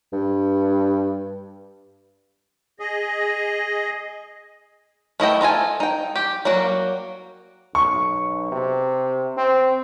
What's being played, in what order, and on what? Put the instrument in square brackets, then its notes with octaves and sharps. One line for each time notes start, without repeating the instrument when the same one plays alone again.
[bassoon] G2
[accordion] G#4 D#5
[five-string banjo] A3 E4 D#5 G5
D#4 F4 A4 G#5
D#4 G5
G4
F#3 G3 A#3 F#4
[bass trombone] B1 [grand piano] C#6
[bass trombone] C3
C4